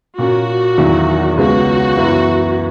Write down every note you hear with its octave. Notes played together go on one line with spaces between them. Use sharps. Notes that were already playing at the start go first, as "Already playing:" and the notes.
A#2 A#3 C#4 F#4
E2 D#3 F#3 A#3 E4
C#2 C#3 G#3 B3 F#4
F#2 E3 B3 E4